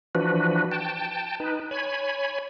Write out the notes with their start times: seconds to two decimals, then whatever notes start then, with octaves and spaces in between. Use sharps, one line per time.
0.15 E3 F3 D4 F#4 B4
0.71 G5 A5
1.40 D#4 B4
1.71 C#5 G#5 B5